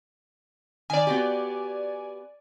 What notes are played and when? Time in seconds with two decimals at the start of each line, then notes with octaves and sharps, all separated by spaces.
0.90 D#3 D5 G#5
1.07 B3 F#4 G4